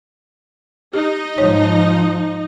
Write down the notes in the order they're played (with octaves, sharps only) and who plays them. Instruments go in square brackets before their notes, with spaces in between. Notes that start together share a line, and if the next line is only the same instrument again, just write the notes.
[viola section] D#4 D#5 [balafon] G4
[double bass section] G#2 F3 [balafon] C#5